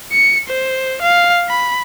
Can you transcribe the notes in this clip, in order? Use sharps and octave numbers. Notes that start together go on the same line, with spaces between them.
C#7
C5
F5
B5